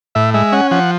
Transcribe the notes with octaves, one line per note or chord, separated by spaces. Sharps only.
A2 E5
G#3 E5
C#4 F#5
F3 F#5